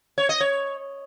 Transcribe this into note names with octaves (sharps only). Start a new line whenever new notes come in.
C#5
D#5
C#5